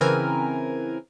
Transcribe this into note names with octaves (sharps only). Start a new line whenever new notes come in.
C#3 E3 C4 A#4 B4 G#5